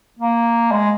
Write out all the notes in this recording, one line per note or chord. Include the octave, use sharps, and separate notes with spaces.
A#3
G#3